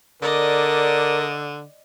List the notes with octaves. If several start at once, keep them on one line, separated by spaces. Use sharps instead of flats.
D3 A#4 D5 D#5